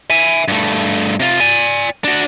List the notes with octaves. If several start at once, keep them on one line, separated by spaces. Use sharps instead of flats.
E5 G#5
G2 A3
C3 F4
D5 G#5
D4 F#4